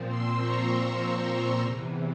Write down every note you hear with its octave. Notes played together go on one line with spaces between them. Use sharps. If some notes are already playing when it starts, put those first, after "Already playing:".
Already playing: A#2 F3 C4
C6 E6
A#5 C#6
A#5 C#6
E2 C3 E3